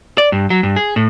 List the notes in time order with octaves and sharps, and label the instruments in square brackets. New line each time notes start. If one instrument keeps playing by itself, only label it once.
[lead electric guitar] D5
G2
F#3
G2
G#4
A2